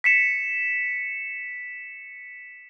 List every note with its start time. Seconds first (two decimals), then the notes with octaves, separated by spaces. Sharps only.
0.04 B6 C#7 E7